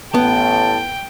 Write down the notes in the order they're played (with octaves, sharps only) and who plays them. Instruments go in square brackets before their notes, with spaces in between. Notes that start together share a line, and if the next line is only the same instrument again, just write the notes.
[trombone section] A1 A2 [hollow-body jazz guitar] B3 [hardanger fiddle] G5 [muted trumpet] A5